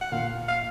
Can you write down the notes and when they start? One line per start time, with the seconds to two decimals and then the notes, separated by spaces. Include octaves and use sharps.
0.01 F#5
0.12 A#2 F5
0.48 F5